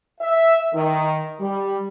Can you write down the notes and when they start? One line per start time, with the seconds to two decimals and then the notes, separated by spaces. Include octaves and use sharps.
0.20 E5
0.73 D#3
1.40 G3